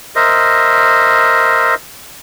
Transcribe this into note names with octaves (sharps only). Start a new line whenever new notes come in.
A#4 C5 D#5 E5